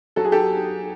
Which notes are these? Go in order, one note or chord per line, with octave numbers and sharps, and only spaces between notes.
F#3 A4
G#4
G4 A4